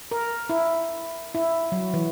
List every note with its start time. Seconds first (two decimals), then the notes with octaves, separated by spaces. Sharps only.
0.11 A#4
0.49 E4
1.35 E4
1.72 F#3
1.94 E3